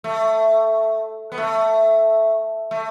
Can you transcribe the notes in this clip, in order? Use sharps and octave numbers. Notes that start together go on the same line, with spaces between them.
A3
B3
A3
A3